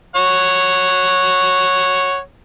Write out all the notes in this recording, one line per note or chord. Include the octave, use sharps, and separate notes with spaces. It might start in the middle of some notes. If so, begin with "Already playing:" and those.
C#5 F#5